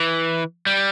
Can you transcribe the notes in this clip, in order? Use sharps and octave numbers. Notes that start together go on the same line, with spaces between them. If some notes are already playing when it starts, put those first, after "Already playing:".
Already playing: E3
G3